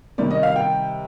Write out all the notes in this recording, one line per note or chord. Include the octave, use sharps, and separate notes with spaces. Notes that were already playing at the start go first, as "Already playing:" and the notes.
C3 D#3 G3 D5
D#5
F5
G5